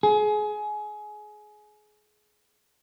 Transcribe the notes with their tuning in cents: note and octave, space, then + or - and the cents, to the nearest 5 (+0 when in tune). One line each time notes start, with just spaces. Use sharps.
G#4 +25